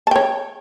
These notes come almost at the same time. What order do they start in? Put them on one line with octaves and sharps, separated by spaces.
A5 G5 C#5